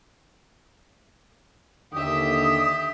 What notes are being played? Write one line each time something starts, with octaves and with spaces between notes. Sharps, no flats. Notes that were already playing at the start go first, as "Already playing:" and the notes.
D#2 D3 G4 E5 D#6